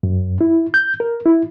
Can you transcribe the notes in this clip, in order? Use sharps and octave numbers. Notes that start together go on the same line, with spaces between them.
F#2
E4
G6
A#4
E4